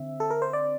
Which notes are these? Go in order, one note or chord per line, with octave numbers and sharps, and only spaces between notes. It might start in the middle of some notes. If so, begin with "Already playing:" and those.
Already playing: D3 C4 E5
A4
A#4
C5
D5